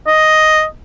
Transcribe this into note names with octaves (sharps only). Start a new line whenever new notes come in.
D#5